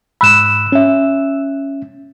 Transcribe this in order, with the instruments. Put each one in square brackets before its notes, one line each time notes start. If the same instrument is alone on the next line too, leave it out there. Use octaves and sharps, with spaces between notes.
[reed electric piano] G#2 B5 [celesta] E6 F#6 E7
[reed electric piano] C#4 E5